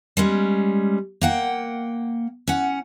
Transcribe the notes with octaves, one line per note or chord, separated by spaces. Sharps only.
G3 G#3 C#4
A#3 F#5 G5
C#4 F#5